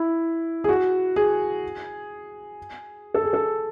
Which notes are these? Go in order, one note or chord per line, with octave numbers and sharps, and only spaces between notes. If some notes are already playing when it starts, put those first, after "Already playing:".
Already playing: E4
G#4
F#4
G#4
A4
G#4
A4